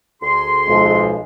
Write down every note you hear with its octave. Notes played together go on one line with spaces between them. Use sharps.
D2 G#4 C6
B1 F3 G#3